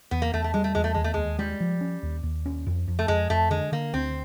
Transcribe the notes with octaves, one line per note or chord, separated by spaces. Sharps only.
E2 B3
A#3
E2 A3
A3
G3 G#3
A3
E2 G#3
A3
D#2 G#3
A3
D#2 G#3
G3 G#3
F3
C#4
D#2
D#2
C#4
F2
F2
A3
F2 G#3
F2 A3
D3 G#3
D3 A#3
D2 C4